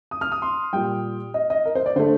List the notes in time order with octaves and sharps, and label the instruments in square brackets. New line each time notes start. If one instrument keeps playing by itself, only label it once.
[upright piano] D#6
F6
D#6
C6
A#2 G3 G5
D#5
D#5
A#4
C5
D5
D3 A3 C5